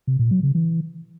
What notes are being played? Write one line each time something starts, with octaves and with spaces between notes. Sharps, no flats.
C3
A#2
F#3
C#3
E3